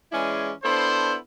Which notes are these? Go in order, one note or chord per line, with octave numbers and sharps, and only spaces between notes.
E3 G#3 C#4 E4 G#4 D5
B3 D4 E4 A4 C5